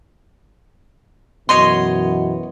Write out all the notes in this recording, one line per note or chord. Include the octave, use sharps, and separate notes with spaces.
F#2 B2 E3 C#5 D#5 C6